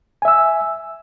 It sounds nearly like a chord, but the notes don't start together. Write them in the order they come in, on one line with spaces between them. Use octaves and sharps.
G#5 E5 E6